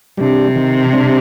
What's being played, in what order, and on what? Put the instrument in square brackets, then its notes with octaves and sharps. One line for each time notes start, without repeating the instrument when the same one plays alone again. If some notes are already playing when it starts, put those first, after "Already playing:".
[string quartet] C3 [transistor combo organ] G3 D4
[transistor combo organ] D#3
G3 D4